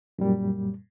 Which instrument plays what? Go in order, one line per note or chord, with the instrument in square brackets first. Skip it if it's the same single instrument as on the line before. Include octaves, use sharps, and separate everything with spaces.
[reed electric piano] F#2 A#2 G3